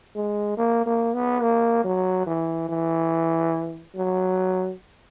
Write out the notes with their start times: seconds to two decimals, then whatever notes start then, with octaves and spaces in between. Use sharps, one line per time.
0.16 G#3
0.58 A#3
0.86 A#3
1.14 B3
1.42 A#3
1.85 F#3
2.27 E3
2.69 E3
3.96 F#3